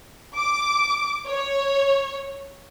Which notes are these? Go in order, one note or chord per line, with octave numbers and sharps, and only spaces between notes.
D6
C#5